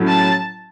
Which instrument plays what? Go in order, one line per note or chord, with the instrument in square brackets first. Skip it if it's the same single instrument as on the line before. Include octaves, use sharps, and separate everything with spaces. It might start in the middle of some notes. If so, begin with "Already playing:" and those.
Already playing: [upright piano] A2 F#3 C#4 E4
[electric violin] A5